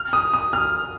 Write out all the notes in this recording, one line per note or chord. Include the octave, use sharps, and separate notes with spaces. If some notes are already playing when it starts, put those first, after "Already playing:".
Already playing: F6
D#6
D#6
F6